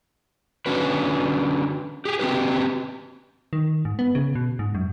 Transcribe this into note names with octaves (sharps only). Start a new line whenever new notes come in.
D3 C#4 F#4 B4
G4 G#4
C4 F#4 G4 B4
D#3
G#2
B3
C#3
B2
G#2
F#2